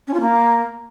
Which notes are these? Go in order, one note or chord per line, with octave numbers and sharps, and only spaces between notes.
C#4
F4
A#3